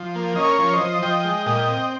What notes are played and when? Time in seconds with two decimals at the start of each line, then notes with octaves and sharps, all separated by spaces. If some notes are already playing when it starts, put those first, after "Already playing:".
Already playing: F3
0.15 A#3
0.36 C#4 D#5
0.44 A#4 C#5
0.59 F3
0.73 C5 D#5
0.80 F3
1.02 F3 D#5 G5
1.24 G#3
1.46 A#2 D#5 G5
1.68 C4